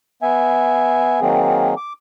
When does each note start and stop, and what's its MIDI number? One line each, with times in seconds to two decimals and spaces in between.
0.23 1.20 59
0.23 1.20 76
0.23 1.20 80
1.21 1.75 51
1.21 1.75 54
1.21 1.75 58
1.21 1.75 60
1.21 1.75 68
1.77 1.93 86